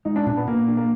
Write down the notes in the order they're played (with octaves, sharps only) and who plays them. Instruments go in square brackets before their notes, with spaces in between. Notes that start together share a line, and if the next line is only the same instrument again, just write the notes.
[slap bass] G#3 [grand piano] D#4
[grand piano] D4
[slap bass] A#2 [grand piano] D4
[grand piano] B3
[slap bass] A#2 [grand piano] A#3
[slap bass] D4
[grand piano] A#3